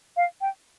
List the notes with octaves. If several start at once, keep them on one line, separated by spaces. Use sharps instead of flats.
F5
G5